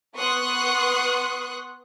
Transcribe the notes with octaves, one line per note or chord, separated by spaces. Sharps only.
B3 C6 C#6 D#6 F#6